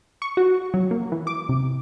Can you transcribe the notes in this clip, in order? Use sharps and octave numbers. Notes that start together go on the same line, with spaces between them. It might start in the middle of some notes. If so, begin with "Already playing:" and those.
C#6
F#4
F#3
A#3
E3
D6
C3